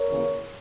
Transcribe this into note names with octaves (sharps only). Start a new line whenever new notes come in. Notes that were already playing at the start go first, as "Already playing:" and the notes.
Already playing: A#4 C#5
D#2 C#3 E3 A#3